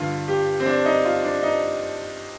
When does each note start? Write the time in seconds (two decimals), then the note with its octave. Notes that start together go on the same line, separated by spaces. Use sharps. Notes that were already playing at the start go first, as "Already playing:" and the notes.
Already playing: G2 D3 F4
0.28 G4
0.60 C4
0.66 D4
0.85 D#4
1.05 F4
1.24 D4
1.43 D#4